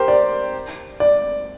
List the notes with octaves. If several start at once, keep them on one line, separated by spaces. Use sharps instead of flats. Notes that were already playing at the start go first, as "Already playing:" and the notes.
Already playing: G4 A#4 C5
D5
D5